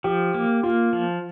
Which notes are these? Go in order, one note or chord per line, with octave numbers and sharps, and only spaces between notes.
F3 G4
A#3
A#3 F4
F3